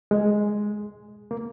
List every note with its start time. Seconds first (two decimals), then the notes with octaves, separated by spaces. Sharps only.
0.11 G#3
1.31 A#3